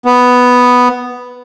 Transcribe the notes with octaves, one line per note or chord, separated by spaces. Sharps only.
B3